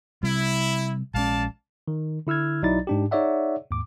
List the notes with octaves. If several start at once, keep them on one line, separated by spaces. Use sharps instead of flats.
C3 G3 E4
A#1 G#3 C#4 D5 F5 A5
D#3
D3 E4 E6 F6 G#6
B1 F#3 D#4 E4 D5 A6
G#2 D4 G4
D#4 G#4 C#5 D5 E5 F#5
D#2 G#2 D6